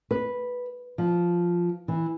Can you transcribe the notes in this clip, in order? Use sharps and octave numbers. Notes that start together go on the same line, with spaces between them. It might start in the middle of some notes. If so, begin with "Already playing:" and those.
B4
F3
E3